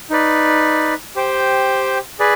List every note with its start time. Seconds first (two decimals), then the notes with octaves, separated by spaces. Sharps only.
0.10 D#4 B4 D5
1.16 G4 C5 G5
2.19 G#4 B4 D5